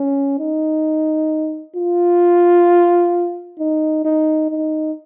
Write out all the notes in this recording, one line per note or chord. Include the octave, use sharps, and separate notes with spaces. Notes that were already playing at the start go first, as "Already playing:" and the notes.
Already playing: C#4
D#4
F4
D#4
D#4
D#4